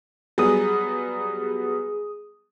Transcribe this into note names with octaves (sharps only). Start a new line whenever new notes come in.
F#3 G3 B3 G#4 D#6